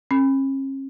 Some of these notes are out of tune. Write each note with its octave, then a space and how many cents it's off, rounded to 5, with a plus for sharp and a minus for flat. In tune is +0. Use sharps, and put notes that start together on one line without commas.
C#4 -45